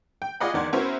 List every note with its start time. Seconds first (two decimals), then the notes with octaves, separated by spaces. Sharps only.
0.22 G5
0.40 F4 G#4 D5 D#5 F#5 B5
0.54 E2 D#3 D5 F#5 C6 G#6
0.73 B3 C#4 E4 F#4 A#4 C5